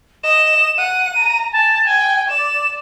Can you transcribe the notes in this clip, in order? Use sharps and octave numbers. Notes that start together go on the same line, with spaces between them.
D#5 E7
F#5 D#7
A#5
G#5 A5
G5 G#5
D5 E7